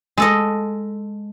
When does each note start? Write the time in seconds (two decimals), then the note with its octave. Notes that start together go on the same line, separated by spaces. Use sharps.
0.18 G#3 A4 D#5